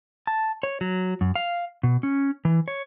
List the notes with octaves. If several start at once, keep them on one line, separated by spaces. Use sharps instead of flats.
A5
C#5
F#3
F#2
F5
B2
C#4
E3
C#5